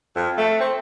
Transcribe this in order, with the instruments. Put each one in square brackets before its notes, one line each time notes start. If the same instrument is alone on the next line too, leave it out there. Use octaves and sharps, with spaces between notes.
[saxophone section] F2
A3
C4